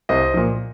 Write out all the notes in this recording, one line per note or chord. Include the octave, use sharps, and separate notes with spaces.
C2 C5 D#5
A#2 F3